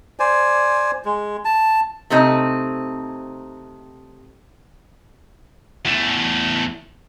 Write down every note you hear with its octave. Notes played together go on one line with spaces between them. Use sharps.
C5 D5 G#5
G#3
A5
C3 A3 C4 D#4
E2 A3